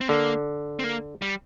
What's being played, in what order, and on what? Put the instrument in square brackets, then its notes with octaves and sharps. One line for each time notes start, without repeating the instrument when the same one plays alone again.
[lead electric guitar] C4
[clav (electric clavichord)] D3 [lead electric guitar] A#3
[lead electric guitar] C4
A#3
G3